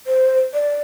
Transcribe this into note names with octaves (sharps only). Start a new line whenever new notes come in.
C5
D5